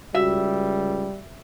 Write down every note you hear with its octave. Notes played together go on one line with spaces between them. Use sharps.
C#2 G3 F#4 E5